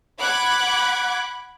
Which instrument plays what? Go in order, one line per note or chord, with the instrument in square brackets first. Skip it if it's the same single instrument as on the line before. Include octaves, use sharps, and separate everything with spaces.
[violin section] F#5 B5 D6 F#6 G#6